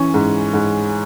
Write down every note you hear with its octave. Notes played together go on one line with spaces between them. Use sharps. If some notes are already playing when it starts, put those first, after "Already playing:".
Already playing: E3 C#4
G#2
G#2